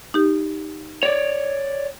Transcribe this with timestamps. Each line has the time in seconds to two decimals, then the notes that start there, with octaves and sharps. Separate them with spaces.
0.14 D#4 G4
1.03 C#5 D5